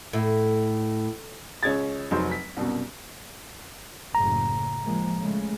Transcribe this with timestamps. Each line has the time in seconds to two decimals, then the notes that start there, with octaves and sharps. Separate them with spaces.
0.13 A2
1.63 C#2 C#4 G#4 G#6 A6
2.11 F1 F#3 D#4 C5
2.31 B6
2.56 C2 F#2 B2
4.15 F#1 A2 C#3 A#5
4.84 F3 G#3 A#3
5.19 C#3 G#3 A3